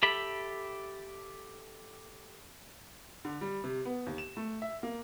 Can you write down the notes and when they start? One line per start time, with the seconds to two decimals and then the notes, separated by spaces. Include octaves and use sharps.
0.03 G4 A4 E5 B5
3.25 D3
3.41 G3
3.64 C3
3.85 B3
4.07 D#2
4.18 E7
4.37 A3
4.62 E5
4.83 A#3